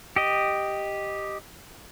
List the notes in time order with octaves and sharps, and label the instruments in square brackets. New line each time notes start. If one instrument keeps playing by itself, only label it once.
[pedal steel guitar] G4 D#5